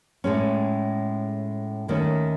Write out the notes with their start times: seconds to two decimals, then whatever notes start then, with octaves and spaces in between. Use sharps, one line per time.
0.24 A2 G#3 C#4
1.88 D#2 D#3 A3 C#4